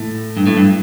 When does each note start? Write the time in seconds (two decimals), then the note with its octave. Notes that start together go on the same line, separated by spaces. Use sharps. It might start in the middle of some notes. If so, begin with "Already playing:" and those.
Already playing: A2
0.37 G2
0.47 A2
0.57 G2